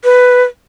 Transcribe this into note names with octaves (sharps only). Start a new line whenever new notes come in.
B4